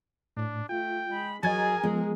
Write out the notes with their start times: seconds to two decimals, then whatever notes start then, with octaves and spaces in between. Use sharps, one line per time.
0.37 A2 D4
0.69 A3 F4 G5
1.10 G#3 B5
1.43 F#3 G#4 A#4 D#5 G#5 G#6 A6
1.83 F3 G#3 B3